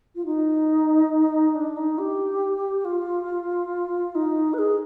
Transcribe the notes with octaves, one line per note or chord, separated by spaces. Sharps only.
F4
D#4
D4
D#4
G4
F4
D#4
B4
G#4